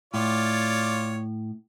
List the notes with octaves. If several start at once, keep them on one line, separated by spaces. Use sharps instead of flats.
A2 F4 C#5 D5